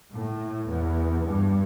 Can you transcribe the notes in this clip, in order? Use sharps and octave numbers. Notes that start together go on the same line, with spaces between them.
A2
E2
G2